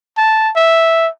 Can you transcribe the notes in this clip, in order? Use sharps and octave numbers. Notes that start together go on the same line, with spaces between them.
A5
E5